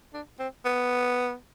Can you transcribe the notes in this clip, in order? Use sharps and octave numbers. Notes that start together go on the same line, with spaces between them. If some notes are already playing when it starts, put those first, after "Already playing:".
D4
C4
B3